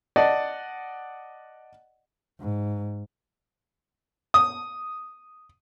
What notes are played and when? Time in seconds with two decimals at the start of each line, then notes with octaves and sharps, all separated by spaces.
0.16 D5 D#5 F#5 A5
2.41 G#2
4.34 D#6